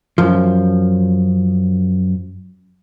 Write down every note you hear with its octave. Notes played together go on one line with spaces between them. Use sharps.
F#2 F3